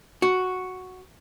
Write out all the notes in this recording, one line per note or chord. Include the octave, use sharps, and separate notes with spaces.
F#4